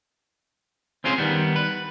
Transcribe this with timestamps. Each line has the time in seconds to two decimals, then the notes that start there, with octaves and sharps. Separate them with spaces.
1.04 C4 C#4 F4 G#4 A#4 C5
1.18 D#3 G3 B3
1.56 B4